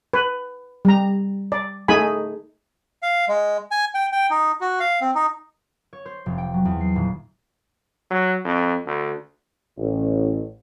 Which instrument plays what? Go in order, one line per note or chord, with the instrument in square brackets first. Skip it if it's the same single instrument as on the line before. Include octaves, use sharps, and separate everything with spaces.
[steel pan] B4
G3 A#5
D5
A3 D#4 G#4 G#5 B5
[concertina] F5
G#3
G#5
G5
G5
D#4
F#4
F5
C4
D#4
[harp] C#5
C5
F1
G5
F#3
E2
C7
D#1
[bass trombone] F#3
F2
D2
[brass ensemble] A1